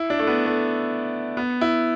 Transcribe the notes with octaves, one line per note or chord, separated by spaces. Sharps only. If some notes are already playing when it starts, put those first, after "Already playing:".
Already playing: E4
D4
A3
B3
A3
B3
E4